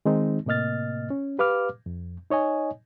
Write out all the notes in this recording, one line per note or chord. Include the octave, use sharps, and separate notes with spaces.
D#3 G#3 C4 D#4
A2 C3 A#3 D#5 F6 A6
C#4
G4 B4 F5 D6 F6
F2
D#4 C#5 D#5 G#5